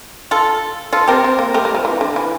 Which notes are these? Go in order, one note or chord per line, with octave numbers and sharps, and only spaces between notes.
F4 A4
F4 A4
C4 G4 A#4
C4
A#3
A3 G4 A#4
G3
F3
E3
D3
E3